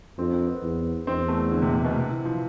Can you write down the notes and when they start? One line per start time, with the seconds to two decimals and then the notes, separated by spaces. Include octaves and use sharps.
0.18 F2 C4
0.33 C4
0.47 B3
0.62 E2
1.06 E2 C4
1.28 A3
1.51 D3
1.62 C3
1.73 C3
1.84 B2
1.96 C3
2.10 E3
2.25 F3